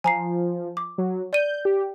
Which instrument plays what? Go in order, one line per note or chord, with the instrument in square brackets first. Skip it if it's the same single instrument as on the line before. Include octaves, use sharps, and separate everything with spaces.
[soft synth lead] F3 [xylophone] G#5 A#5 C7
[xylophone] D6
[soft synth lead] F#3
[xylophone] D5 D#7 [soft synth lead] G6
[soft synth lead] G4